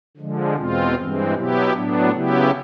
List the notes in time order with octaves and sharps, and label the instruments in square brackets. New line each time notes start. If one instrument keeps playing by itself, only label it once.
[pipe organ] D3 F3 G#3
E2 B2 G#3 C4 F4
G2 E3 G#3 C4
B2 F#3 B3 E4 G4
A2 F#3 B3 D4
C#3 F#3 B3 E4 G4